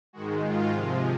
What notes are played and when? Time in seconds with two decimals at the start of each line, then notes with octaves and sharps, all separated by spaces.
0.13 G#2 D#3 G#3 F#4
0.42 F4
0.72 C3 F3 G#3